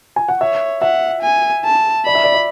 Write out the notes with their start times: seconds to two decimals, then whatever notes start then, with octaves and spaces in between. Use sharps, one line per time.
0.16 G#5
0.28 F#5
0.40 C#5 E5
0.82 E5 F#5
1.23 G#5
1.65 A5
2.06 D5 B5
2.15 E5
2.24 D5
2.34 D5